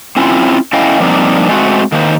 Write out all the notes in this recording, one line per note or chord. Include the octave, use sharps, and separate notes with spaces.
C4 C#4 E4 F4
A3 C#4 E4 D#5 F5 G5
F3 G3 A#3 C4 D4 D#4
G#3 A3 C4 F#4
D#3 A#3 C5